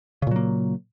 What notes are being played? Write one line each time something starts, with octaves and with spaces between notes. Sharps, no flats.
A#2 C#3 F#3 A#3